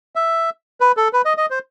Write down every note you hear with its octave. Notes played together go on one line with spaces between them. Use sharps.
E5
B4
A4
B4
D#5
D#5
C5